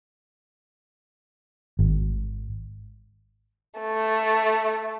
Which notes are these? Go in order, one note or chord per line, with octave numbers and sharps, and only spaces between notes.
G#1
A3